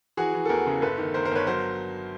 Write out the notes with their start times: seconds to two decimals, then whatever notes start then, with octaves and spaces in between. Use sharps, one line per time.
0.17 E3 F#4 G#4
0.34 E3
0.45 A4
0.49 E2 G#4 A#4
0.67 C#3
0.82 G1 A4 B4
0.98 D#3
1.14 G1 A#4 C5
1.25 A#4 C5
1.31 G1 B4 C#5
1.47 F#3 A#4 C5